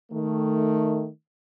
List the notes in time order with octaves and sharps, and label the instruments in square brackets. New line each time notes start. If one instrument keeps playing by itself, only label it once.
[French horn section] D#3 A3